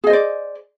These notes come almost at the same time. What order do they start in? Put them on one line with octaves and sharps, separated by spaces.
G#4 D#5 C5 D5